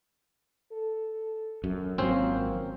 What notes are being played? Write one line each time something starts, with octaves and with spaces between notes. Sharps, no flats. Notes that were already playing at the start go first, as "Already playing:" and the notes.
A4
F#2
G#1 F3 F#3 A#3 C4 C#4 C5